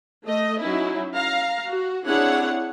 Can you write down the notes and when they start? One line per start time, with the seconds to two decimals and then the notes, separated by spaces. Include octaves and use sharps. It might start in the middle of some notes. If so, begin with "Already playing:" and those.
0.23 A3 D#5
0.60 F#3 C#4 D#4 E4
1.14 F5 A#5
1.67 F#4
2.04 C4 D4 E4 G#4 C#5 F#5